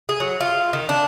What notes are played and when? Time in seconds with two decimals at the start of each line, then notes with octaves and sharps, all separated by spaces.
0.09 G#4
0.20 F#3
0.41 F4
0.73 D#3
0.89 D4